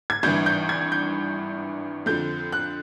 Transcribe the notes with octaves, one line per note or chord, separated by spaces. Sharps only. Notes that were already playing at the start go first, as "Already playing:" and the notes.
G#6
G#1 G2 E3 G6
G6
G#6
G6
F2 D3 F3 G6
F#6